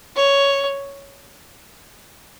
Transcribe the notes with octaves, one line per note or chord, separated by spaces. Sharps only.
C#5